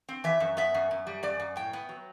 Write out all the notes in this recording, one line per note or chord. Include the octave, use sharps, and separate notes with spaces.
C4
E3 E5
F#2
B3 E5
F#2
F#2
G3
F#2 D5
F#2
A2 G5
B3
F#3